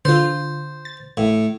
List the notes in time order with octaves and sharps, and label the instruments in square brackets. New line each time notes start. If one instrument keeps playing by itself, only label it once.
[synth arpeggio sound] D3 F4 [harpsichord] C5
[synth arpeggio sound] A6
[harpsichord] A2